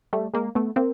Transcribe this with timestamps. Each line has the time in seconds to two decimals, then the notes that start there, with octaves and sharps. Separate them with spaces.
0.13 G3 A3
0.34 G#3 A#3
0.55 A3 B3
0.76 A#3 C4